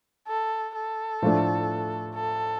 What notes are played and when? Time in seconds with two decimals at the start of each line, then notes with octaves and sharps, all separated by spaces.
0.28 A4
0.75 A4
1.22 A2 F3 A3 D4
2.15 A4